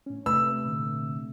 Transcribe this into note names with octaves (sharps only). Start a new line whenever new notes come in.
A2 C#4
C3 A3 B4 E6
A#2 D3